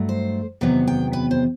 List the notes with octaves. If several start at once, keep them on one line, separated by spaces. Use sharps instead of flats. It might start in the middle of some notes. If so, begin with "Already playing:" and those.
Already playing: G2 F#3 A3
C5
E2 C3 D#3 F#3 B3 E5
G5
B4
C5